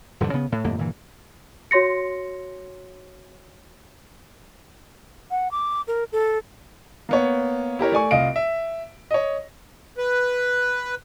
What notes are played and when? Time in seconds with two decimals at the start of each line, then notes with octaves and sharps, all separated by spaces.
0.20 D#1 G2 D3 F3
0.33 C#3 B3
0.52 A2
0.64 G1 F2 A2 A#3
0.79 G1 A#2 E3
1.71 F#4 C#5 C6 A#6 C#7
5.31 F#5
5.51 D6
5.88 A#4
6.12 A4
7.09 A#3 B3 C#5
7.79 E4 G4 A#4 C#5
7.92 A3 D5 G#5 C#6
8.11 C2 F4 D#5 F5 D7
8.36 E5
9.11 C#5 D#5
9.98 B4